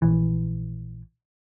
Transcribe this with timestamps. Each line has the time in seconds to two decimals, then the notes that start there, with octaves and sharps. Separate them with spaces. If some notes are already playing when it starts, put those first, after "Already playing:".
0.02 A#1 E3